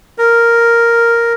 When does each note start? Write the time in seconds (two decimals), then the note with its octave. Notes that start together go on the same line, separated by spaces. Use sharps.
0.18 A#4